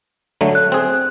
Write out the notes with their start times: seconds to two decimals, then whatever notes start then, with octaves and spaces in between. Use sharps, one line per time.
0.41 D3 F#3 A3
0.55 F#6
0.72 C4 G#4